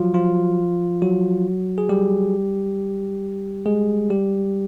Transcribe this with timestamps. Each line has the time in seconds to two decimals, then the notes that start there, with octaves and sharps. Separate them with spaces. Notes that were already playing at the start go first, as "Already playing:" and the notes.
Already playing: F3 F#3 F4 F#4
0.14 F3 F4
1.02 F#3 F#4
1.78 G#4
1.89 G3 G4
3.66 G#3 G#4
4.10 G3 G4